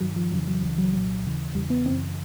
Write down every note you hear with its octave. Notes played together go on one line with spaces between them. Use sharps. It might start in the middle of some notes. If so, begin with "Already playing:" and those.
G2 D#3 F#3
F3
F2 C#3 E3 F#3
F#3
C#2 C#3 E3
F#3
C2 A#2 F#3
D#2 C#3 E3
E2 C#3 E3 G3
B3
F#2 C#3 E3 C4